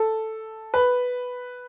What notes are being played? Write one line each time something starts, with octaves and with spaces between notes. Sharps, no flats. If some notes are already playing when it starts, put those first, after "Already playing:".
Already playing: A4
B4